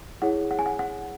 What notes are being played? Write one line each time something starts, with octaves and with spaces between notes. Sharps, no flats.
E4 G#4 C#5 F#5
F#5
G#5
F#5
F#5